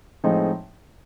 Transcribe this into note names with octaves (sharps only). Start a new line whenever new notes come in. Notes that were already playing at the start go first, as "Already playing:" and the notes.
A2 F3 G#3 C4 D#4